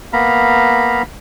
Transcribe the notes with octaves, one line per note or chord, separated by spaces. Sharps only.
A#3 B3 F5 A#5 B5